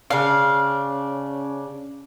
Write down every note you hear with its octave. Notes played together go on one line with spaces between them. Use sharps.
C#3 C#4 D4 F5